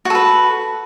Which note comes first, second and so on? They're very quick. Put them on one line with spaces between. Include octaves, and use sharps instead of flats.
F#4 A4 B4